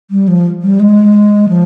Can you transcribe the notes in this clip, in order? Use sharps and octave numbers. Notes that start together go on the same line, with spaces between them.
G3
F3
G3
G#3
F3